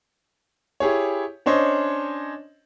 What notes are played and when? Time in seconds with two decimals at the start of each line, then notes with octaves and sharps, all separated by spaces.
0.80 E4 G4 G#4 C#5
1.46 C#4 D4 C5 C#5 D#5